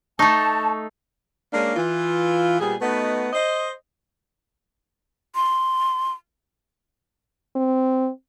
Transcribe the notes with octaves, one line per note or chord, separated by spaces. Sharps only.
A3 D#4 A5 C#6
G#3 A#3 C#4 D4
E3 F4
A#2 G3 B3 G#4
A3 B3 D#4 F#4 B4 D#5
C5 D#5
C6
C4